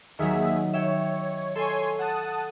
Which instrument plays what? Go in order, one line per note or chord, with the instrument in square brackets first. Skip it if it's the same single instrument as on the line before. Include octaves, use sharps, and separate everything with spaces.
[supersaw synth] D#2 G#4 E5 [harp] D#3 F#3
[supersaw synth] C#5 [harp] E5 G5
[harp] A4 [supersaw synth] C#5 G#5 C6
[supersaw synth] F#5 A5 D#6